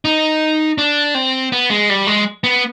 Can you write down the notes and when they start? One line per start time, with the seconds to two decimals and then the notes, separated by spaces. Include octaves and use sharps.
0.05 D#4
0.78 D4
1.15 C4
1.52 B3
1.70 G#3
1.89 G3
2.07 G#3
2.44 B3